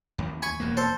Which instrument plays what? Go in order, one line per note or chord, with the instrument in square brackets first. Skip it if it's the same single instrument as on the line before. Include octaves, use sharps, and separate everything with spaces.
[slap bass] A1 D#2
[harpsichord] G#5 B5 C#6
[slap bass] E1 D#2 A#3
[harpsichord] A4 C5